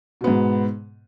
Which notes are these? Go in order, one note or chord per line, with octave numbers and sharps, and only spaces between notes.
G#2 B2 B3